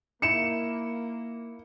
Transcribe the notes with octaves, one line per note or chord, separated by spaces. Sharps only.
A#3 D#4 E4 C#7 E7